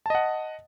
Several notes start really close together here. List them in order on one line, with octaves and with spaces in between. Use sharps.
A5 D#5 F#5